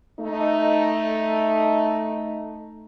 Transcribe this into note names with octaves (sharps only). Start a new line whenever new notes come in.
A3 D#4